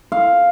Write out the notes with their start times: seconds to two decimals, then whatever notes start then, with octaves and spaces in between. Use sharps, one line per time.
0.12 F5